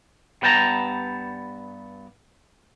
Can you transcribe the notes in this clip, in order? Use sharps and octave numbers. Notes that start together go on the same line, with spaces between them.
G2 B3 G5 A5 A#5